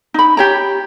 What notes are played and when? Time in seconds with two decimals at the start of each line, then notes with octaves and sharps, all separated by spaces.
0.14 D#4 B5
0.37 G4 C#5 A#5